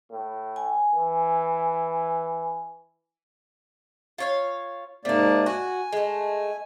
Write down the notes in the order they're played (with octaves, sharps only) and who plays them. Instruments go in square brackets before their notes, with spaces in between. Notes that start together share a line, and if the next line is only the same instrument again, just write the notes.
[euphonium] A2
[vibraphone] G#5
[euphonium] E3
[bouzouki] F4 C#5 F5
[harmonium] G#2 A#3 D5 [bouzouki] C3 A3
[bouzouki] F#4 [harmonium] G#5
[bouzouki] G#3 A3